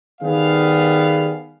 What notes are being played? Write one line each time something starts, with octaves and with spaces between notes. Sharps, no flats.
D#3 G3 B3 G#4 F5